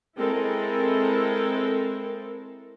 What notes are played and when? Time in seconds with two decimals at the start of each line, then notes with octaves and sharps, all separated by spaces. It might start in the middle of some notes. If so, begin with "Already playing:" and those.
0.17 G#3 C4 E4 A4 A#4